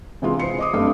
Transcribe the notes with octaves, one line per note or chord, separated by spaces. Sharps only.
C3 E3 G#3 F4
C5 C7 C#7
D#5 D6 D#6
G2 A3 C4